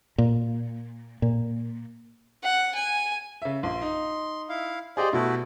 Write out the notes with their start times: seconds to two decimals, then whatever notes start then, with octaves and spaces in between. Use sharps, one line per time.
0.18 A#2
1.22 A#2
2.44 F#5
2.75 G#5
3.42 C#3 E5
3.63 A#1 C6
3.82 D#4
4.49 E4 F5
4.97 G4 G#4 C5 D5 D#5
5.13 B2 A3 E4 F#4